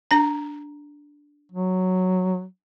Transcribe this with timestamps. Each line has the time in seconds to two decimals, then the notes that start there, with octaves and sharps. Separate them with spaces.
0.11 D4 A#5
1.52 F#3